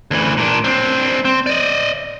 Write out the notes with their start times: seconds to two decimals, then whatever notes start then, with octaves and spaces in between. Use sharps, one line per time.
0.11 D2 E3
0.37 A#2 D4
0.64 C4 D4
1.25 C4
1.46 D5 D#5